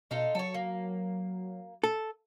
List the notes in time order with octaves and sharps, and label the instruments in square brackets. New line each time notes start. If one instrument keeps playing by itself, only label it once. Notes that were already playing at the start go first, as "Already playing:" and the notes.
[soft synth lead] B2 [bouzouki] D#4 F4 A4
[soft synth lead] F#3 [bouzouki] A4 C#5
[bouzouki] A#3
[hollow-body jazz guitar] A4